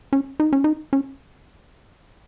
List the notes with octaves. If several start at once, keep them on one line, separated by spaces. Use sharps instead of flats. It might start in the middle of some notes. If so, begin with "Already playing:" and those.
C#4
D#4
C#4
D#4
C#4